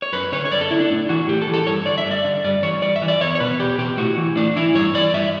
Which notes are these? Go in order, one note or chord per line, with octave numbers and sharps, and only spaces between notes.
C#5
F#2 B4
D3 C#5
C#5
F#2 D5
A4
D3 E4
D4
A2
E3 F#4
A2 G4
A4
E3
A4
G2 C#5
D3 D5
E5
G2
D5
D3
G2 D5
E3 C#5
G2 D5
E5
E3
D5
E2 C#5
C#5
B2 B4
E2 G4
B2 G4
A2 F#4
E3
A2 D4
E3 E4
G2 C#5
E3 D5
G2 E5